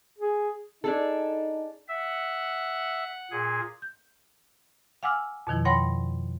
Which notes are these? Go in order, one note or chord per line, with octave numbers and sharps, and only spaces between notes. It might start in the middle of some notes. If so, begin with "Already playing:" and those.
G#4
D4 D#4 G#4 A4
E5 F#5
A#2 G#4
G6
F5 F#5 G#5 D6 E6 F6
F2 B2 D#3 F3 E4
C#5 F#5 G5 B5 C6 A#6